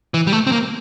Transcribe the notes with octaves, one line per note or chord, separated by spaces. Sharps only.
E3
G3
A3
C4
A#3